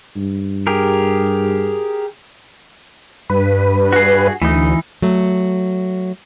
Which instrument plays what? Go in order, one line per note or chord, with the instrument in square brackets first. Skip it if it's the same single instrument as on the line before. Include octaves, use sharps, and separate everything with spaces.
[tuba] G2
[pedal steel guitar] G4 G#4 A#4
[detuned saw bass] G2 [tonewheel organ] B4
[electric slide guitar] F#4 G#4
[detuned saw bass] D2 [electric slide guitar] E3 D#4
[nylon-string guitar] F#3 A3